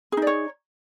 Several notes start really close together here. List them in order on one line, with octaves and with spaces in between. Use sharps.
G#4 D#4 D5 C#5